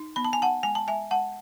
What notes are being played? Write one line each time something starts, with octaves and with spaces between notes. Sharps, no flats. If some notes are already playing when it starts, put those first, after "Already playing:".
Already playing: D#4
B3 B5
A5
G#5
D#4 F#5 A5
G#3 G#5
A5
G#3 E5 G#5
G#3 F#5 A5